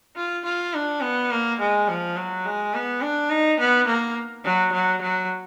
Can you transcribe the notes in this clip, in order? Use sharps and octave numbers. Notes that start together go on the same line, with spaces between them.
F4
F4
D4
B3
A#3
G#3
F3
F#3
G#3
B3
D4
D#4
B3
A#3
F#3
F#3
F#3